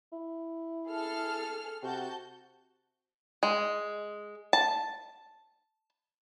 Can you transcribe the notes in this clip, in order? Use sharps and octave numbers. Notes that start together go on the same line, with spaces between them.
E4
G#4 A4 F6
C3 F#4 A5 G6
G#3
A5